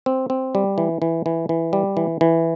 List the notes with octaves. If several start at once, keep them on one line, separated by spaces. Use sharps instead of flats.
C4
C4
G3
E3
E3
E3
E3
G3
E3
E3